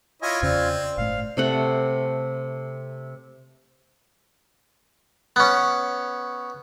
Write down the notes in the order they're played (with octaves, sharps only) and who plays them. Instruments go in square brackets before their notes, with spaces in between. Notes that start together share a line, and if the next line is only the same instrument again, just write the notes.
[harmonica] E4 C#5 D#5 [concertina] F4 G#5
[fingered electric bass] E2 C#3 C#4 [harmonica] C4 [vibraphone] C5 D5
[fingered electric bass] G1 A2 A3 [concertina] F5
[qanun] C3 A3 F#5
[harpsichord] B3 C#4